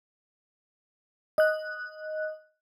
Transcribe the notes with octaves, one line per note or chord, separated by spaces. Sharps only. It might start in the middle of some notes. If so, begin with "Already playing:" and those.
D#5 F#6